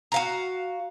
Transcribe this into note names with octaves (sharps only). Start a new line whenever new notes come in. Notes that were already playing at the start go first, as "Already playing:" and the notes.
F#4 F5 A#5